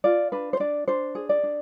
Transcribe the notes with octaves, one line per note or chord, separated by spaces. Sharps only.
F4 D5
D4 B4
C5
D4 D5
D4 C5
G#4
D5
D4